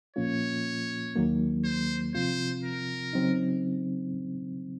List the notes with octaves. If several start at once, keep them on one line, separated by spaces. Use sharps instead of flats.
A#2 F3 A#3 C#4 F4 C#5
D#2 D#3 F#3 A#3
C5
C3 F3 C4 F4 C5
A#4
C#3 F#3 C4 D#4